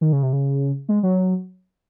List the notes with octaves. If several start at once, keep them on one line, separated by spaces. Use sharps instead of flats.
D#3
C#3
C3
C#3
G#3
F#3